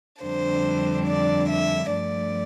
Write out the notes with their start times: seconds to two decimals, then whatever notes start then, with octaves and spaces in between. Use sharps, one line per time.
0.22 F2 D3 G3 D4 C5
1.07 D5
1.49 E5
1.92 G2 F3 A3 D5